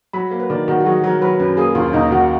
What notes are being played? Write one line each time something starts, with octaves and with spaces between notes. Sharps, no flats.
F#3 B5
A#3
B4
D#3 D5
D#3 F#4
F#4
F#3 G#4
F#3 A#4
F#3 B4
F#2 B4
A#3 G#4
D#2 F4
D#2 D#4
D#3 F#4